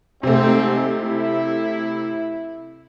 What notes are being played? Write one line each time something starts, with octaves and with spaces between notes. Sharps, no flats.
G#2 C3 A3 C4
E4